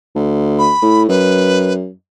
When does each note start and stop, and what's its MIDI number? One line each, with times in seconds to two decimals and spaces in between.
0.15 0.71 38
0.59 1.03 83
0.82 1.05 45
1.09 1.89 42
1.09 1.73 71